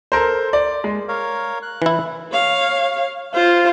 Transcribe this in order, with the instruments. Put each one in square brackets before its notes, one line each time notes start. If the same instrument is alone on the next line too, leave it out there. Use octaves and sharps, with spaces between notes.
[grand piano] A4 A#4 C5
D5
G#3
[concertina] A#4 C#5 F5
F#6
[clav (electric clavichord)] E3 E4
[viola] C#5 F5
[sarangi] F4 [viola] C5